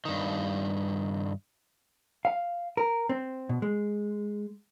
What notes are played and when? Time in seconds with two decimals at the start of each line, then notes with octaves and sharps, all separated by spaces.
0.05 G2 D#3
2.25 F5
2.77 A#4
3.09 C4
3.49 B2
3.62 G#3